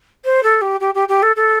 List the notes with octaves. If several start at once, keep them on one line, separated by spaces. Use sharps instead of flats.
C5
A4
G4
G4
G4
G4
A4
A4